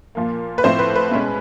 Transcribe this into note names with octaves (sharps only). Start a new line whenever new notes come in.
A#2 F3 A#3
B4
A2 F3 A3 C4 E4 C5
B4
B4
B2 G#3 C#4